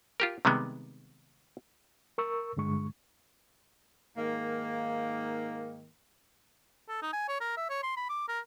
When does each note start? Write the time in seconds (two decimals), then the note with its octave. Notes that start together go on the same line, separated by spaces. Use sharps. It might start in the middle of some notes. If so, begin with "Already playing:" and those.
0.20 F4 G4 A#4
0.45 C3 D#3 G3 G#3 B3
2.18 A#4 C#6 E6
2.57 G2 D3 G#3 C#6
4.16 G#2 D#3 A#3
6.89 A4
7.02 D#4
7.13 G#5
7.28 C#5
7.40 A#4
7.57 E5
7.69 C#5
7.83 C6
7.97 B5
8.09 D6
8.28 A#4